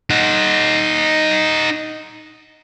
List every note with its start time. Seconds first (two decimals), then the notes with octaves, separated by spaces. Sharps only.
0.10 D#4 F#5